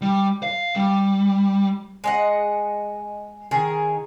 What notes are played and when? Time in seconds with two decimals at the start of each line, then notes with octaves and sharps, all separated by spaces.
0.02 G3
0.43 F5
0.76 G3
2.04 G#3 D#5 F#5
3.51 D#3 G#4 A#4